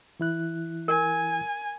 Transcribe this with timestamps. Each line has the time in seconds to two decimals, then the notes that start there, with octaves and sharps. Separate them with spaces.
0.20 E3 E4 F#6
0.88 A#4 G#5